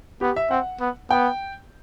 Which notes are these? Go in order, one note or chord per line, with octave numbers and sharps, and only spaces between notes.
B3 G4
E5
C4 F#5
B3
B3 G5